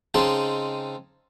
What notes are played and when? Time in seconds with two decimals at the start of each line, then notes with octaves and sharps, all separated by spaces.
0.14 C#3 G#3 C4 D#4 A5